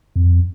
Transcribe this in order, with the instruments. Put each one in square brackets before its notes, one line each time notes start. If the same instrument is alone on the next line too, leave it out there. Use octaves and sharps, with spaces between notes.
[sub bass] F2